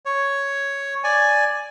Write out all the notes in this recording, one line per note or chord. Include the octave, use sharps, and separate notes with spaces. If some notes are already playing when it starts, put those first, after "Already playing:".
C#5
D5 G#5